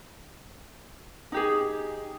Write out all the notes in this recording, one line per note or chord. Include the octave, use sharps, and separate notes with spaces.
D#4 G4 G#4